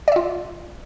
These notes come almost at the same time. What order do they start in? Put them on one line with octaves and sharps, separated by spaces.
D5 E5 F4